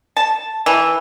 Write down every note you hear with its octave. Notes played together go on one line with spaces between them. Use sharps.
A5
E3